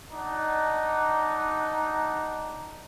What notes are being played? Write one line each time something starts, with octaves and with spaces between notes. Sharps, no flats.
D4 D#4 D5 F#5